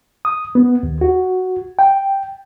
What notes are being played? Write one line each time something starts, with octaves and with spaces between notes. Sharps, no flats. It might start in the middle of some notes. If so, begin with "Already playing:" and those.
D#6
B3
D#2
F#4
G5